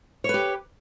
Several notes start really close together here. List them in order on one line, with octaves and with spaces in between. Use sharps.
C#5 B4 G4